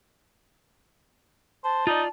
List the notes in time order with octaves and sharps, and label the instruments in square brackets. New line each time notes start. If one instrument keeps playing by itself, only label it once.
[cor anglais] C5 [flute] A5
[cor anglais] D#4 [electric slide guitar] F4 D5